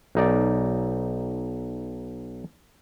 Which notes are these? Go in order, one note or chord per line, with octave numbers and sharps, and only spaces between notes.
B1 D#4 D5